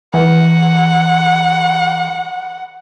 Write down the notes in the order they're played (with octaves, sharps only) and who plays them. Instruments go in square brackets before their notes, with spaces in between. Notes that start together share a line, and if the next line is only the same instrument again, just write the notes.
[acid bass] E3 [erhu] F#5